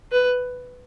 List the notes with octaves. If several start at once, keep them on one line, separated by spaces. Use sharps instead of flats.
B4